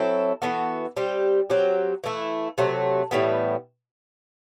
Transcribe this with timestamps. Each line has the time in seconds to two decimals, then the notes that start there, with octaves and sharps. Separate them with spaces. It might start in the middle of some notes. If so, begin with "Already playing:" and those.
Already playing: F#3 C4 E4 A4
0.42 E3 B3 F#4 A4
0.97 G3 C4 G4
1.50 F#3 C4 G4
2.04 E3 A3 E4
2.58 C3 F#3 A3
3.11 A2 E3 G3 B3